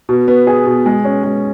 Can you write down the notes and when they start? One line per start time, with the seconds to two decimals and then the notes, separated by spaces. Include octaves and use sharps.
0.09 B2
0.28 B3
0.47 G#4
0.66 B2
0.86 G#3
1.05 C#4
1.24 G#3